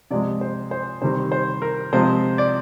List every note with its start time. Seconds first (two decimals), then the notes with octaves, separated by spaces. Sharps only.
0.11 C3 F3 G#3 D5
0.41 C5
0.71 C5
1.02 C3 D#3 G3 C4 C5
1.32 C5
1.62 A#4
1.93 C3 F3 G#3 C4 C5
2.38 D5